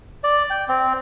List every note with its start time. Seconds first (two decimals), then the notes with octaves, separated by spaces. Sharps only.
0.24 D5
0.50 G5
0.68 C4